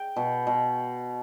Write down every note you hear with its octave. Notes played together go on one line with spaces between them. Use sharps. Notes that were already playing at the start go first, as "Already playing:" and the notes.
Already playing: G5
B2
B2